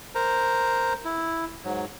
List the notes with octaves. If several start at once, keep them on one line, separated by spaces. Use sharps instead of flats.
A#4 C5 A#5
E4
G#2 F#3